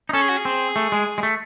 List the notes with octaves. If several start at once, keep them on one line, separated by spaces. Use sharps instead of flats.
D#4
C#4 A4
G#4
F#4
G#4
C4
A3
G#3
G#3
A3